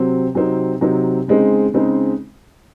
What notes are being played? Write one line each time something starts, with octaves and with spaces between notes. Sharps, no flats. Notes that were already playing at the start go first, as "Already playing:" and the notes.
Already playing: C3 F#3 C4
C3 F#3 C4 D#4
C3 F#3 C4 D#4
C#3 G#3 C4 D#4
C#3 G#3 C4 D#4